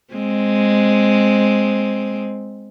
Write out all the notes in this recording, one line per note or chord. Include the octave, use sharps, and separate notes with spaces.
G#3 C4